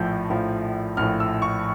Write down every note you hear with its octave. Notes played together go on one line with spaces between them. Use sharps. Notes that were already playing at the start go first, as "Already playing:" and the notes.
Already playing: A#1 A2 F3 G6
A#1 A2 F3
A#1 A2 F3 F6
E6
C#6